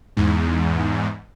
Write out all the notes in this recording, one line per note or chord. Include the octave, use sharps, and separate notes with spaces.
E2 G#2